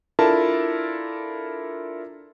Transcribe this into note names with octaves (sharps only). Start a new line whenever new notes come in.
D4 E4 F4 A4 A#4 A5